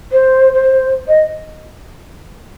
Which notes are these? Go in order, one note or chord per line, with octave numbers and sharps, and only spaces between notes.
C5
C5
D#5